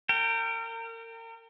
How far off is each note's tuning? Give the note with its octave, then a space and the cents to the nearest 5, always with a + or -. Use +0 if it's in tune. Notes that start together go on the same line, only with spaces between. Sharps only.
A#4 -35 G5 +0